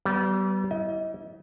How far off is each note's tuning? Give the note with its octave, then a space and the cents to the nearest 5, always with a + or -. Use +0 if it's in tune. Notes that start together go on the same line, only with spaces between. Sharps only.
G3 -35 B3 +0
E4 -5 D#5 +30